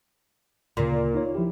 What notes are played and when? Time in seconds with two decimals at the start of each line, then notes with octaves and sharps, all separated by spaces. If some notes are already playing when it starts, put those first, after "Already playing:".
0.77 D2 A#2 C#3
1.14 D#4 F4 C#5
1.35 F3 E4 G4